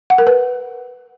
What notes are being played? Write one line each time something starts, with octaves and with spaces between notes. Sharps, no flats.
F#5
A#4
B4